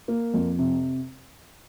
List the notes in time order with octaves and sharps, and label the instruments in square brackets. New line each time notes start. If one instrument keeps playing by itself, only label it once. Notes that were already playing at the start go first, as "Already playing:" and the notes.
[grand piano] A#3
F2
C3